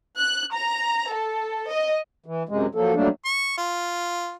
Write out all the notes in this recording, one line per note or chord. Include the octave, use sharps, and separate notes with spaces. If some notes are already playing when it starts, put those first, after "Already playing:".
F#6
A#5
A4
D#5
E3
F#2 C3 G#3
F3 F#3 A#3 A4
F#3 G3 A3 A#3 D4
C#6
F4